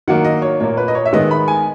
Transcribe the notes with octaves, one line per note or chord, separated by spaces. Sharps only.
D#3 F#3 A#3 F#5
D#5
C#5
A#2 A#3 C#5
B4
D#5
C#5
E5
D#3 G#3 B3 D#5
B5
G#5